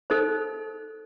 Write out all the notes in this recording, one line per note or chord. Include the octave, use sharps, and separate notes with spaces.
D#4 A4 C5